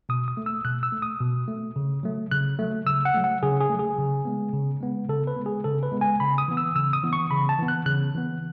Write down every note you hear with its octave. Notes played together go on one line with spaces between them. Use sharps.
B2 D#6
D#6
A3
E6
B2 F#6
E6
A3
D#6
B2
A3
C#3
F#3 A3
C#3 F#6
F#3 A3
C#3 E6
F#5
F#3 A3
F#5
C#3 G#4
G#4
F#3 A3
G#4
C#3
G#3 B3
C#3
G#3 B3
C#3 A4
B4
G#3 B3
G#4
C#3 A4
B4
G#3 B3
G#5
C#3 B5
D#6
E3 B3
E6
C#3 E6
D#6
E3 B3
C#6
C#3 B5
A5
E3 B3
F#6
C#3 F#6
E3 B3